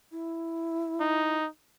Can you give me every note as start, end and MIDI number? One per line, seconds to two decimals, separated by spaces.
0.12 1.37 64
1.00 1.47 63